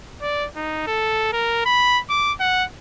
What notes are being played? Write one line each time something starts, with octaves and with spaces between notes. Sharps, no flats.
D5
D#4
A4
A#4
B5
D6
F#5